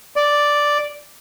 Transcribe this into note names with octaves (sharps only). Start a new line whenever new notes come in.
D5